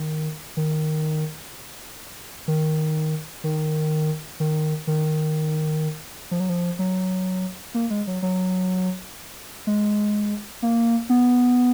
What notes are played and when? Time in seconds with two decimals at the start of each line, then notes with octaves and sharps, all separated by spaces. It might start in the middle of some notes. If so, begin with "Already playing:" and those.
Already playing: D#3
0.57 D#3
2.48 D#3
3.44 D#3
4.40 D#3
4.87 D#3
6.31 F3
6.40 F#3
6.49 F3
6.79 F#3
7.74 A#3
7.90 G#3
8.07 F#3
8.22 F#3
9.67 G#3
10.62 A#3
11.09 B3